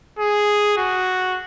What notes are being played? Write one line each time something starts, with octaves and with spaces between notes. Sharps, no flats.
G#4
F#4